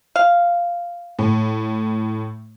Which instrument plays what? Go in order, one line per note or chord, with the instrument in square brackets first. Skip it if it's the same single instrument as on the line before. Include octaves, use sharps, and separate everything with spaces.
[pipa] F5
[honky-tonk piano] A2